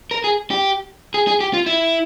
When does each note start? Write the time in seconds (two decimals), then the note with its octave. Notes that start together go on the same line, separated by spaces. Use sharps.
0.11 A#4
0.24 G#4
0.51 G4
1.14 G#4
1.27 G#4
1.41 G4
1.54 F4
1.66 E4